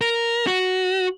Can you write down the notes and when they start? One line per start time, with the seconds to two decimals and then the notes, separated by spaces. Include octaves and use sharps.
0.01 A#4
0.47 F#4